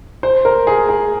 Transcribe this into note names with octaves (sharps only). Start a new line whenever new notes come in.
C5
A#4
G#4
G#4